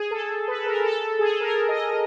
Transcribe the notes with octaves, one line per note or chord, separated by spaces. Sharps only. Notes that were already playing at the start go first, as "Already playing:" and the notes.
Already playing: G#4
A4
B4
A4
A#4
A4
G#4
A4
A#4
D#5